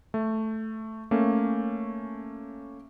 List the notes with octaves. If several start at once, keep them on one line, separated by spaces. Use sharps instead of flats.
A3
A3 A#3 C#4